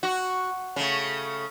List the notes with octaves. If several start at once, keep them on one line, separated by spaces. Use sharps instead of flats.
F#4
C#3 A3